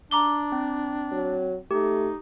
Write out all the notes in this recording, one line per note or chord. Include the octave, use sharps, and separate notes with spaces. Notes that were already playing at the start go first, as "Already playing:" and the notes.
D4 A#5 D6 G7
C4
F#3
A3 D#4 G4